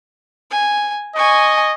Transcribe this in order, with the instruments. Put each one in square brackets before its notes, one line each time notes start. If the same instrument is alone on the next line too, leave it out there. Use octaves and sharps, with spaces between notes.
[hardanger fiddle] G#5
[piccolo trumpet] D#5 [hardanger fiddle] G#5 C#6